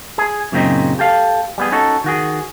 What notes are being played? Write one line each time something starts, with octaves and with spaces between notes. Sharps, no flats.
G#4
F#2 A#2 C#3 F#3 C4 D#4
G4 A4 F5
G3 B3 G#4
C#4 D#4 F#4 A4
D#3 F#4 G#4